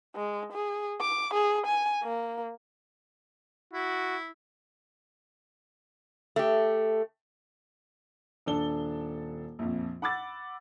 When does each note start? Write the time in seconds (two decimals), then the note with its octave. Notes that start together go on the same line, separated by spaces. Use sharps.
0.16 G#3
0.53 G#4
1.01 D6
1.34 G#4
1.67 G#5
2.03 A#3
3.73 E4 F#4
6.36 A3 G4
8.46 D#1 D4 A4 G7
9.59 A#1 F2
10.02 F#5 B5 D6 E6 A6